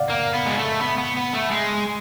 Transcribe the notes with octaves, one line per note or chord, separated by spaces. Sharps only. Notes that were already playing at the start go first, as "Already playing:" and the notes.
Already playing: D5 F5 F#5
A#3
B3
G#3
A3
B3
B3
B3
A3
G#3